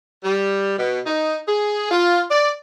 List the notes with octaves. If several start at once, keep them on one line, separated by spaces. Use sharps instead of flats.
G3
B2
D#4
G#4
F4
D5